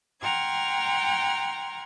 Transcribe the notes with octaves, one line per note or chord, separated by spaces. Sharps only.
F#5 G5 A#5 C6 F6 G#6